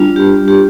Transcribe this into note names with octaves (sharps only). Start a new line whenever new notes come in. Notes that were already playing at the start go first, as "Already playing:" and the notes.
Already playing: G3 D4 F4
G4
G4